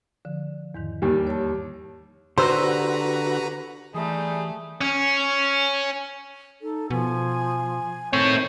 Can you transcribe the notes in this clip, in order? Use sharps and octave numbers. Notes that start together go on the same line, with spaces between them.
D3 F3
E2 G#2 D#3
D#2 G3
C#5 A5
D3 F#4 G4 B4 C5 A#5 E6
E3 G3 A3 D#4 G#4
C#4
D#4 A4
B2 F3 G#5
D#3 A3 C4 C#5 G6